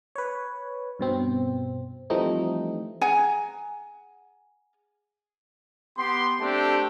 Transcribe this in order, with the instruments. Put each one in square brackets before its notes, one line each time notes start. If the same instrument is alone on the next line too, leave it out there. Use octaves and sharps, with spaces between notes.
[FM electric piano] B4 C#5
G2 B2 C4
E3 F3 G3 A3 C4 D#4
[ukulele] G#4 F#5 G#5 A#5
[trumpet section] B3 G4 C6
A3 C4 D4 G4 A4